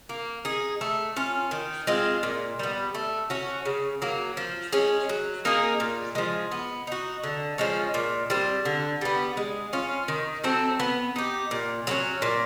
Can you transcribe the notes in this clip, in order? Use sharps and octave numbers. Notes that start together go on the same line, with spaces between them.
A#3
D#4 G#4
A3
C#4 F4
D#3
G#3 C4 F4
A#2
G3 B3
A3
C#4 F#4
C#3
F#3 A#3
F3
G#3 C#4
F#3
A#3 D#4 G#4
A#2
F3 G#3
B3
D#4 F#4
D3
F3 G#3 C#4
A#2
G3 C4
D3
G3 B3
G#3
C#4 F4
D#3
F#3 A3 C4
B3
D#4 G4
A#2
F#3 A#3 C#4
A#2